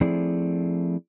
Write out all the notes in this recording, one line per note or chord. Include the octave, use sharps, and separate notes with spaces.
F3 A3 C4 E4 G#4 D5